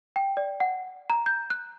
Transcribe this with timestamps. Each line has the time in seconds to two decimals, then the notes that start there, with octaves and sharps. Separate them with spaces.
0.16 G5
0.37 D5
0.60 F#5
1.10 A#5
1.26 G6
1.50 F#6